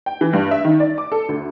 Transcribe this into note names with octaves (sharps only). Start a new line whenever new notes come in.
G5
E3
G2
E5
D#3
D5
D6
A4
D2